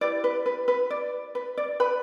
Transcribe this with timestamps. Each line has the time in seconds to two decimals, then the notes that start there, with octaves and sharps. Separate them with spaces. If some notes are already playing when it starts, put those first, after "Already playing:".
0.01 E4 G4 B4 D5
0.24 B4
0.46 B4
0.68 B4
0.90 D5
1.35 B4
1.57 D5
1.80 B4 B5